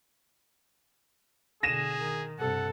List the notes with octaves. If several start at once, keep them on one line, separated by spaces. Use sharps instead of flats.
B2 D3 G#4 A#6 D#7 E7
D#3
G2 C3 A4 F#5